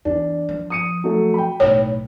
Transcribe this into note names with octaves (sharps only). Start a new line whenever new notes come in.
E2 D4
F3
D#6 C#7 D#7
F#3 A3
G5 B5
B1 A2 C#5